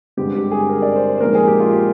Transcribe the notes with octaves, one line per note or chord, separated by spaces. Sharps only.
G2 D3 G#3 C4 G4
G4
G#4
A#4
D5
C5
C5
A#2 F3 G#3 C4 D#4 A#4
G#4
G4
F4
G4